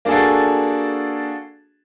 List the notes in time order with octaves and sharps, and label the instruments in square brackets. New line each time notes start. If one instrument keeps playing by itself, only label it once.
[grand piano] A#3 D4 F#4 G#4 A4